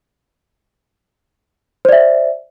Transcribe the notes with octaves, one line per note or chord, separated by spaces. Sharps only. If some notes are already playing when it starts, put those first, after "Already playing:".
C5 D5 E5